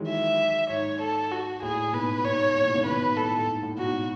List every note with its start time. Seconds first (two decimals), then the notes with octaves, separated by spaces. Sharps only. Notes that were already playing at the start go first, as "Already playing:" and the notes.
Already playing: D#3 E3 F#3 G#3
0.08 E5
0.70 G#2 C#5
1.01 A4
1.32 F#4
1.62 A2 G#4
1.93 G#2 B2 B4
2.24 G#2 B2 C#5
2.55 A2
2.65 G#2 B2
2.75 A2 C#3
2.86 B2 D#3 B4
3.01 G#2 B2
3.16 A2 A4
3.38 A2
3.47 G#2
3.63 A2
3.78 G#2 B2 F#4